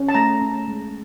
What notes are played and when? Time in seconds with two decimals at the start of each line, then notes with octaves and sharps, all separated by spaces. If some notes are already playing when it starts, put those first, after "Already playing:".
Already playing: C#4
0.09 A5
0.14 A3 A#5
0.41 C#4
0.68 G#3